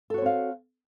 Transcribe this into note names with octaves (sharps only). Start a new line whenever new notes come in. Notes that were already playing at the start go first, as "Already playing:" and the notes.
C4 F#4 A4 C#5 F5